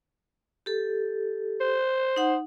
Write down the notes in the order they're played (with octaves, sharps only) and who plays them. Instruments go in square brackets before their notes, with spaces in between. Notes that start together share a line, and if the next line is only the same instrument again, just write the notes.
[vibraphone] G4 A4
[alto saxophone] C5
[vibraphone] D#4 F#5